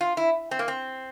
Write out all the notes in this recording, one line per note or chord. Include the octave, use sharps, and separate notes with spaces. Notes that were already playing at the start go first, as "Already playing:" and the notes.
F4
E4
C4
A#3
C4